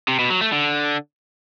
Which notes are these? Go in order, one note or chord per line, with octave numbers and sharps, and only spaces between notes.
C3
B2
F#3
A3
D3